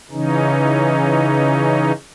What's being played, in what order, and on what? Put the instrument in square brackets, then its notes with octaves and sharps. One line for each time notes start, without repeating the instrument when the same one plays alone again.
[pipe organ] C#3 E3 C#4 D#4